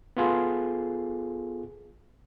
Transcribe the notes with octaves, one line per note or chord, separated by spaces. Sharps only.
B3 F4 G#4 A4